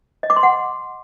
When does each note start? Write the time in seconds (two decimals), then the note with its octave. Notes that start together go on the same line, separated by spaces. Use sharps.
0.23 D#5
0.30 D6
0.36 C6
0.43 F#5